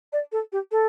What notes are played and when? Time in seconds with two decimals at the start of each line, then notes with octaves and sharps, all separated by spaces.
0.13 D5
0.32 A4
0.52 G4
0.72 A4